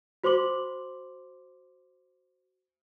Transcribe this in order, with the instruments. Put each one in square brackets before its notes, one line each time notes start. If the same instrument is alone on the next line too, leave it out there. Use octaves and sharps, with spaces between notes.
[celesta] F#4 C5 C6 D6 F#7